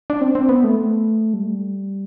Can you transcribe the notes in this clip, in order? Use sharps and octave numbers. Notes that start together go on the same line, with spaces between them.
D4
C4
C4
B3
A3
G3